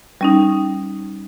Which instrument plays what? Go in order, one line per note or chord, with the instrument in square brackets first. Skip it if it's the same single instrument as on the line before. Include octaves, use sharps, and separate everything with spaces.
[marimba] G3 C#4 D#4